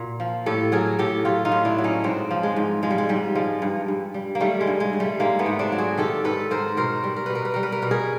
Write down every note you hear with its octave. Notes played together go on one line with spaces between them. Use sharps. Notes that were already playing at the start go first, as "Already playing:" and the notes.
Already playing: A#2 F#4
F3
A2 G4 A4
F#3 G#4 A#4
A2 G4 A4
F#3 F4 G4
D#4 F4
A2
D4 E4
F#3
C#4 D#4
G#2 C4 D4
F3
G#3
G#2
F3 G#3
G3
G#3
G#2 G3
F3 G#3
G2
G2
G3
A#3
D#3 G3 A3
G#3
G2
G#3
G2
G3 A3
G#2 G#3 A#3
A3 B3
G#2
C4 D4
F#3
F#4 G#4
D#3 G4 A4
G#2 A4 B4
G#2 A#4 C5
B2 A#4 C5
G3
A#4
B2 B4
A#4
B4
G3 A#4
B4
A#4
B2 B4
G#4 A#4